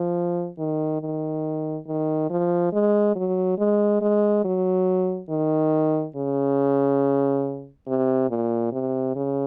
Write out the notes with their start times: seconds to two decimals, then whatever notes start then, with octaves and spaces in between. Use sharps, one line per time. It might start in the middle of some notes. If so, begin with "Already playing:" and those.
Already playing: F3
0.58 D#3
1.01 D#3
1.87 D#3
2.30 F3
2.73 G#3
3.16 F#3
3.58 G#3
4.01 G#3
4.44 F#3
5.29 D#3
6.16 C#3
7.87 C3
8.30 A#2
8.72 C3
9.15 C#3